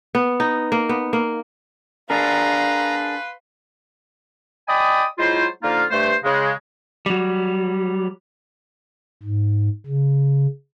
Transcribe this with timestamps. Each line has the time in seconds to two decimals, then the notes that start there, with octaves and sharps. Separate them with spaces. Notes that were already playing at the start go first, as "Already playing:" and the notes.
0.15 B3
0.40 D#4
0.72 A#3
0.89 B3
1.13 A#3
2.10 D4 G#4 A#4 B4 F5 A#5 C6
4.68 D5 D#5 G5 G#5 B5 D#6
5.18 F#3 G#3 E4 F4 C5
5.63 D3 F3 A#3 D#4 F4
5.91 G2 A3 C5
6.24 C#3 G#3
7.06 F#3 G3
9.23 G#2
9.86 C#3